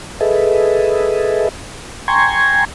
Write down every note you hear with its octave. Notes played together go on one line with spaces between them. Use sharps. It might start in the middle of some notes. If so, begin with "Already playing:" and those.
G#4 A4 B4 D#5 E5
G5 G#5 A#5 C6 C#6 G#6